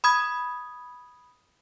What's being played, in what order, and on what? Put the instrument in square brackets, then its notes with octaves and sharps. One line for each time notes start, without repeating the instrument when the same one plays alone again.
[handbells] B5 D#6 G#6